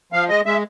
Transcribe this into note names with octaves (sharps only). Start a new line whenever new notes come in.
F3 F5
G#3 D#5
G#3 E5